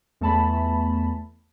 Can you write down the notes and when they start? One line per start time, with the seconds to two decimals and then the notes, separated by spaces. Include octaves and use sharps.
0.21 E2 A3 A5 B5